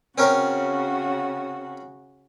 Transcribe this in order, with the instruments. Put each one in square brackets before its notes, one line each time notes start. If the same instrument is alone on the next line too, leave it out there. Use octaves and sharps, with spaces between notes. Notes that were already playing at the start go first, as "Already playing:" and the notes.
[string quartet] C#3 F#4 [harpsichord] C4 C#4 A#4